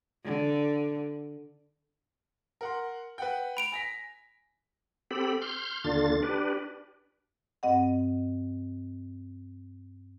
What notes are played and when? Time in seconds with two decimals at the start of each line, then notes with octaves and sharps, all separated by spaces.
0.25 D3
2.61 A#4 F#5 C6
3.18 B4 F#5 G5
3.57 B5 D7 F7
3.72 G#5 A#6 B6
5.11 C4 G4 A4 B5
5.42 C6 F6 G6
5.84 D#2 D3 D4 F4 A6
6.23 D4 G4 B4
7.63 G2 C4 D#5 F#5